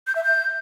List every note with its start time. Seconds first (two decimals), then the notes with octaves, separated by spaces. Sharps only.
0.07 G6
0.16 E5
0.24 G6